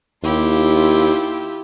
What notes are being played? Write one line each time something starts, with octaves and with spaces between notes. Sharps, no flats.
D#2 E4 F4 G4